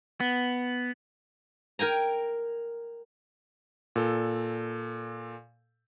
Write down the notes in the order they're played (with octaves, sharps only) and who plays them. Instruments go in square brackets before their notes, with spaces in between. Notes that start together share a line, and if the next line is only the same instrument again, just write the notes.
[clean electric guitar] B3
[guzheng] A#4 G5 G#5 A#5
[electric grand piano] A#2 A4